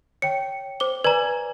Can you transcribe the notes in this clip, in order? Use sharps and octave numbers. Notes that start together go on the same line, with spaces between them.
C#5 G5 C#7
C5 D6 G7
B4 D5 G#5 A#5 G#6